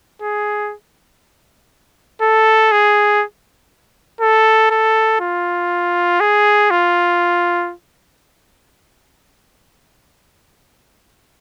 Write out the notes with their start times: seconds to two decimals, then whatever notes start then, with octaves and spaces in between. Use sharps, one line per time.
0.22 G#4
2.22 A4
2.72 G#4
4.21 A4
4.71 A4
5.21 F4
6.20 G#4
6.70 F4